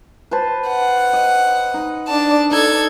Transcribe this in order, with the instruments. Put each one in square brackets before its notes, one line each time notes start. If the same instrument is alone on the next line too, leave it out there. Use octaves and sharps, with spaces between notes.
[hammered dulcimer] B4 C5 A5
[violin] F#5
[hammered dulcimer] D#5
D#4
[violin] D4 A5
[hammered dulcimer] D#4 [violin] A4 G#6